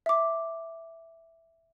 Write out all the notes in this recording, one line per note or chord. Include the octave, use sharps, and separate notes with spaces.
E5 D6